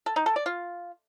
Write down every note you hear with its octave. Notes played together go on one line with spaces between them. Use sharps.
A4
D#4
A4
D5
F4